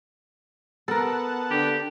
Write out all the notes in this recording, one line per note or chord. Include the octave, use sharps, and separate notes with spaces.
B3 A4 A#4 F#5 A5
D3 G4